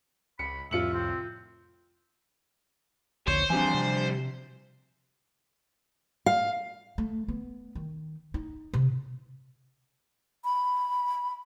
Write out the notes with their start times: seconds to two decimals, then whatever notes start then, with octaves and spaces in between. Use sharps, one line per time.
0.39 C#2 B5 C#7
0.71 C2 F2 A2 F4 E5 C#7 F#7
0.94 C4
3.27 A#1 D#2 D3 C5 C#5
3.50 E3 F3 G3 C4 D4 G4 G#5
3.74 C3
6.26 F5
6.98 A3
7.28 B3
7.75 D#3
8.34 D#4
8.74 C3
10.44 B5